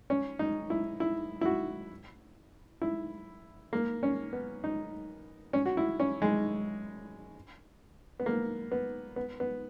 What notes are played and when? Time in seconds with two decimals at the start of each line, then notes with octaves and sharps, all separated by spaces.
0.10 C#4
0.39 D#4
0.70 E4
1.00 E4
1.41 E4
1.45 F#4
2.82 E4
3.73 A#3
4.03 C#4
4.33 B3
4.64 D#4
5.53 C#4
5.66 F#4
5.77 E4
6.00 C#4
6.22 G#3
8.20 B3
8.26 A#3
8.72 B3
9.16 B3
9.40 B3